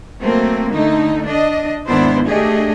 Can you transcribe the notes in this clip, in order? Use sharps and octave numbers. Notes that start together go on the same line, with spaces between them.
F#3 A3 A#3 C4
D3 A3 D#4
D4 D#5
D#2 G#2 B3 D4 E4 C5
A3 D4 G4 G#4 D#5